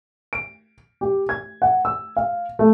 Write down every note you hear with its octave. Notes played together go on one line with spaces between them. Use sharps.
D7
G4
G#6
F#5
E6
F5
A3